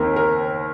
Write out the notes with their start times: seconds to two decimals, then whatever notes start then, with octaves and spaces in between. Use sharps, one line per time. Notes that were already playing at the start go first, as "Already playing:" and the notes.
Already playing: D#2 D#3 C4 D#4 A#4
0.16 A#4